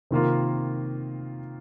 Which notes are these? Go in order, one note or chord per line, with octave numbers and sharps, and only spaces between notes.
C3 D#3 A#3 F4